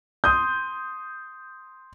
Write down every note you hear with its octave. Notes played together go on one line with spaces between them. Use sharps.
C6 D#6 G6